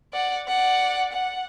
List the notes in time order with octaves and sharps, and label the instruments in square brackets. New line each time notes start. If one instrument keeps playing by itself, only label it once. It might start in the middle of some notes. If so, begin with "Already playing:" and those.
[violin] D5 F#5
D5 F#5
F#5